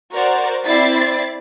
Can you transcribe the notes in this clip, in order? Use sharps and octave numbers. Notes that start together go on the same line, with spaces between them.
F#4 A#4 C5 D5
C4 E4 D5 A6 C7